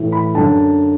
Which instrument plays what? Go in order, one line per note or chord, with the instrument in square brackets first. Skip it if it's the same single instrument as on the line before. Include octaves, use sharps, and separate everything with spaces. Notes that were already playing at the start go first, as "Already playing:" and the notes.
Already playing: [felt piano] A2 E3
B5
F#2 D3 A5